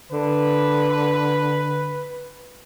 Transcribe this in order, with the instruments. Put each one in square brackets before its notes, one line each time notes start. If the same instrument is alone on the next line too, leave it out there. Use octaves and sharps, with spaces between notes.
[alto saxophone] D3 [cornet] B4